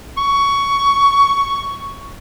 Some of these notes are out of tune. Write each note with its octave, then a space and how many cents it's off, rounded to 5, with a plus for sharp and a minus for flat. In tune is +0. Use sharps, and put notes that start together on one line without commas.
C#6 +10